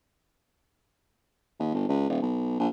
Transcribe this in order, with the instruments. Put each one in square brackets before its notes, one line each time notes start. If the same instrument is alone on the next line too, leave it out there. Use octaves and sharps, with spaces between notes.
[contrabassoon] D#2
G1
C#2
D#1
B1
A#1